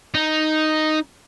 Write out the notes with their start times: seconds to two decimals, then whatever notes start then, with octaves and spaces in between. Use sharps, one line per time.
0.15 D#4